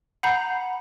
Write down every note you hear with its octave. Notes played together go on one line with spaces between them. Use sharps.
F#5 A#5 B5 G6 C7